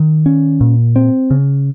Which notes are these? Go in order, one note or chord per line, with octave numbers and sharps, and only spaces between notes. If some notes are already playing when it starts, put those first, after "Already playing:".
Already playing: D#3
C#4
A#2
C4
C#3